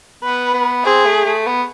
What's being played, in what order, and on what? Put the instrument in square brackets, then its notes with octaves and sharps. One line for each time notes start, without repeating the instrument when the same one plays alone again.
[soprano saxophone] B3 [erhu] B4
[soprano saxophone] B3
[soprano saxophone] C4 [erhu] G#4
[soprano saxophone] A3
A3
B3